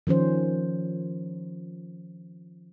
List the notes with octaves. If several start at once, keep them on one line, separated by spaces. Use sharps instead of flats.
D#3 F3 C#4 C5